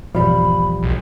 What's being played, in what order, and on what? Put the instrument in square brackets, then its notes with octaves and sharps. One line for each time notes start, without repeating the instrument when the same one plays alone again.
[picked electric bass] G#1 E2 B2 [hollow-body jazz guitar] F3 G3 [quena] B5
[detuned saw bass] B1